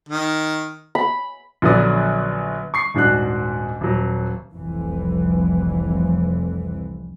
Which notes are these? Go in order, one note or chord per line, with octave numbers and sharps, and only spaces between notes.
D#3
B5
A#1 D3 F#3 B3 D5 D#6
C#6 C7
D#1 G#2 D4 F#4 F#6
D#1 F#3
F1 C2 F2 E3